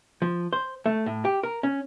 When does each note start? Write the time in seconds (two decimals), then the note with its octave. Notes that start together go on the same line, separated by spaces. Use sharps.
0.22 F3
0.53 C5
0.86 A3
1.06 A2
1.25 G4
1.43 A#4
1.63 C#4